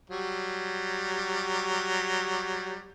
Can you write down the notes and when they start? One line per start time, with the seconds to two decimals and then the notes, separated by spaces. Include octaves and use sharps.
0.10 F#3 G3